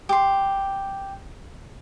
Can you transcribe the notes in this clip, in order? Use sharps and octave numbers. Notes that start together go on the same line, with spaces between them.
G4 C6